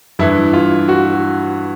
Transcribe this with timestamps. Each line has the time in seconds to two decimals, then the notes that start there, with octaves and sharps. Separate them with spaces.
0.19 G2 E3 E4
0.53 F4
0.88 F#4